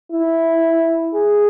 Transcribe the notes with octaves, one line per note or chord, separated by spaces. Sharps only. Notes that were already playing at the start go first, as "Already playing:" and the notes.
E4
G#4